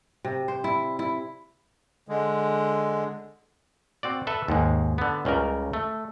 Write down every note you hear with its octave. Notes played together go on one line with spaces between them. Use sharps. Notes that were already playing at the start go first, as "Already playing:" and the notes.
C3
C5
E4
E4
D3 G#3
C4 F#4 D5
A4 B4 E5
D#2 G#2 G#3
D3 B3
C#2 C#3 G3 A#4
A3